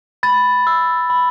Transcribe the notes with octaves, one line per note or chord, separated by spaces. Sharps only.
B5 A6
E6
B5